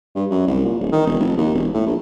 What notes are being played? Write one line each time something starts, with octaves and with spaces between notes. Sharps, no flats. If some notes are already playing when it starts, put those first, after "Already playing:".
G2
F#2
C2
A#2
D1
D#3
E1
F1
D#2
E1
A2
A#1